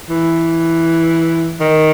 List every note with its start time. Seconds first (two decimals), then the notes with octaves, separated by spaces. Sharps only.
0.09 E3
1.61 D#3